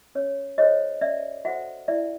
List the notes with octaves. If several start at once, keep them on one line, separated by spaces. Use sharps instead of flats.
C#4 C#5
F#4 A4 C5 C#5 D#5
C#4 D5 E5
F#4 A4 C5 E5 F#5
E4 D5 E5